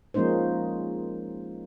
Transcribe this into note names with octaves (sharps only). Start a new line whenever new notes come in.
F3 G#3 A#3 C#4 D#4 C5